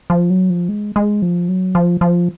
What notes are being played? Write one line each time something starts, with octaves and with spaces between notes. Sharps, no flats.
F3
F#3
F3
G#3
G#3
F3
F#3
F3
F3